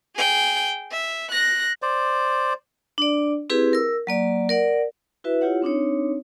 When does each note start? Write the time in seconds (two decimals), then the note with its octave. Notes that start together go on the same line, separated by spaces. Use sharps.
0.16 G#4 G5
0.92 E5
1.32 F#6 A#6
1.82 C5 D5
2.98 D4 D5
3.50 C4 E4 G4 G#4 B4
3.73 A#4 E6
4.07 F#3 A#3 D5
4.49 A#4 D5 F#5
5.24 E4 F#4 B4 E5
5.41 E4 F4 G4 C#5 F#5
5.62 C4 D4 D#4 C#5